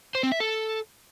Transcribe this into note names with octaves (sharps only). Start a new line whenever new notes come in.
C5
C4
E5
A4